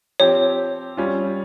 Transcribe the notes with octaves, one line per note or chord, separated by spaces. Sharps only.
F3 C4 G4 C#5
G3 C#4 F4